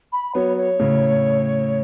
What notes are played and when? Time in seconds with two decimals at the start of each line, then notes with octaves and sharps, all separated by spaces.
0.12 B5
0.35 F#3 B3 C#5
0.58 C#5
0.79 A2 C#3